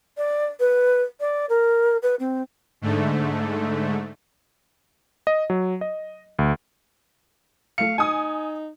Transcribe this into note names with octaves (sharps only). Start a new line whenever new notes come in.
D5
B4
D5
A#4
B4
C4
G#2 D3 A3
D#5
F#3
D#5
D2
A3 F5 C#7
D#4 G#5 D#6